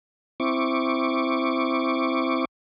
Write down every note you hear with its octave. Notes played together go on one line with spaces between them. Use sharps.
C4 E4 C#6 D6